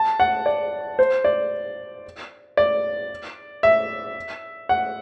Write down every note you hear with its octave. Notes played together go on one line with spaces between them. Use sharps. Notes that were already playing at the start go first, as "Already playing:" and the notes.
Already playing: A5
F#5
D5
C5
D5
D5
E5
F#5